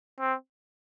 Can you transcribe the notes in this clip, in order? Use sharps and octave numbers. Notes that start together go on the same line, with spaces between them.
C4